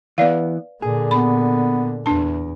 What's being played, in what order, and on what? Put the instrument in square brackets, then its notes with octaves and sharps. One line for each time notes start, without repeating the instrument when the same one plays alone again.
[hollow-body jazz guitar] E3 B3 [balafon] B4 D5 F5
[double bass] A#2 D3 [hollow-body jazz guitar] G#4
[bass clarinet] B3 [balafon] B5
[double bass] E2 [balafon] D4 A5